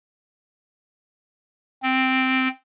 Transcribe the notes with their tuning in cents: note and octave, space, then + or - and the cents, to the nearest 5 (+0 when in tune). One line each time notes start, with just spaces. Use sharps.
C4 -5